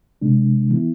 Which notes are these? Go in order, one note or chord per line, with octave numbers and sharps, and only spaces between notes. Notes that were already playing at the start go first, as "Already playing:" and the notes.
C3 G#3 D4
E3 B3 E4